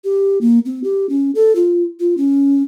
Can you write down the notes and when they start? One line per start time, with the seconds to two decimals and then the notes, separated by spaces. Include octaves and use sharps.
0.04 G4
0.41 A#3
0.66 C4
0.84 G4
1.09 C#4
1.35 A4
1.55 F4
2.00 F4
2.17 C#4